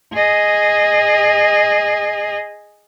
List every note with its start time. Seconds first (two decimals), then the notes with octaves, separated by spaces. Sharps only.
0.13 G#4 D#5